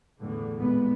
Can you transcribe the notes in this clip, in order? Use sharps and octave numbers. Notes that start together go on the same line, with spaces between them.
E2 A2 D3 E3
G#1 A#2 G3 G#3 B3